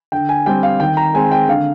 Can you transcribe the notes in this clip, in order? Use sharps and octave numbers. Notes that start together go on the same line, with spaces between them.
D3 G5
G#5
G3 C4 G5
F5
D#3 G5
A#5
G#3 C4 G#5
G5
D3 F5